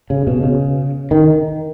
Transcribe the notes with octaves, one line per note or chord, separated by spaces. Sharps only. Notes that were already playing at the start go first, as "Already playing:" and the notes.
C#3
B2
C#3
D#3